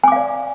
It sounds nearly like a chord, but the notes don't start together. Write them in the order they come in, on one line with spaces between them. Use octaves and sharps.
G#5 D6 F5 D5